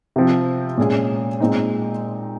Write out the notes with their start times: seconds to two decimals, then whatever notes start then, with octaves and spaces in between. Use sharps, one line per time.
0.16 C3 F3 C4
0.78 A#2 G#3 C#4 G#4
1.40 A#2 G#3 C4 D#4